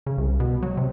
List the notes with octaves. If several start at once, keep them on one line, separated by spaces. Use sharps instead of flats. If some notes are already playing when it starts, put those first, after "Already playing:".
C#3
C2
B2
F#3
C3